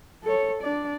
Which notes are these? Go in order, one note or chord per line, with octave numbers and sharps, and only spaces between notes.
A4 C#5
D4 D5